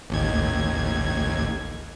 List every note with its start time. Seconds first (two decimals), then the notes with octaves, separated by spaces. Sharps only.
0.10 A1 D#2 G#6